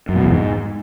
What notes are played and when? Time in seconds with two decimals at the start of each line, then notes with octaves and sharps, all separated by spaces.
0.09 F#2
0.16 B2
0.23 E2
0.30 G#2